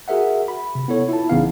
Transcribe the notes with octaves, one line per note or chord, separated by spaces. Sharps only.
F#4 G#4 A#4 E5 F#5
B5
C3
B3 E4 A4 C#5
E4 F4 A5
A1 C#3 E3 B3 D#4 F5